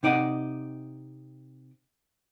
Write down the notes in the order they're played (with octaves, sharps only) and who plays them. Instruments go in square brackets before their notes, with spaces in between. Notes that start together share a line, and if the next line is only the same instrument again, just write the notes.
[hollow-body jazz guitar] C3 D#4 D5 D#5 F#5